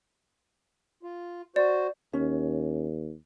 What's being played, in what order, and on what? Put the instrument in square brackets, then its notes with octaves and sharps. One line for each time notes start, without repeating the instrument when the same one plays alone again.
[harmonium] F4
[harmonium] F#4 C5 [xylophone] D5
[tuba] D#2 [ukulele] C#4